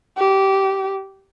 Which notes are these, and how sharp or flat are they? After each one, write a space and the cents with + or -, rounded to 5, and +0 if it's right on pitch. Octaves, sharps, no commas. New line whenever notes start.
G4 -20